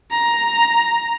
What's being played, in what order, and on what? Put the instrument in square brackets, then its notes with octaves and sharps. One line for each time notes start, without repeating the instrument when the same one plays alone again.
[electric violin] A#5